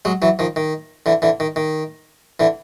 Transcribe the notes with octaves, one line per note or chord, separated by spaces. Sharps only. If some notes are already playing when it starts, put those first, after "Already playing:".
F#3 G#3
E3 F#3
D#3 F3
D#3
D3 E3
D3 E3
D#3
D#3
D3 E3